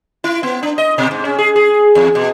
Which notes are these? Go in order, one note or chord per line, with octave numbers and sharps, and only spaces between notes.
E4
B3
D4
D#5
B2
G#2
C#4
G#4
G#4
E2
B2